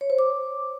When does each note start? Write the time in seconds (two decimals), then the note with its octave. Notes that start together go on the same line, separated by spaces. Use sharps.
0.01 C#5
0.10 C5
0.19 D6